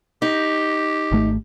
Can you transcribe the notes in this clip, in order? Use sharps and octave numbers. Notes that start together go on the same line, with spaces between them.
D#4 G4
G#1 A3